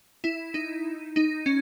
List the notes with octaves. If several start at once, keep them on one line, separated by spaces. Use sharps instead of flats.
E4
D#4
D#4
C#4